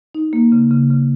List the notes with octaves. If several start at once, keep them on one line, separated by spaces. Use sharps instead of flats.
D#4
A#3
C#3
C#3
C#3